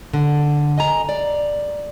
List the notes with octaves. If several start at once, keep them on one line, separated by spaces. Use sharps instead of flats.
D3
D#5 G#5 A#5
D5